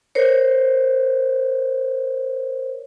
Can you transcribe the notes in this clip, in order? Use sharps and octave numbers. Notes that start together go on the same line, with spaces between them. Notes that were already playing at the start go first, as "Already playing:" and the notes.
A#4 C5 C#5